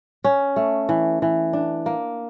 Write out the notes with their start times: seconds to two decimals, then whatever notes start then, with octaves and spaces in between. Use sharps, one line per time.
0.24 C#4
0.56 A3
0.89 E3
1.22 E3
1.53 D4
1.86 A#3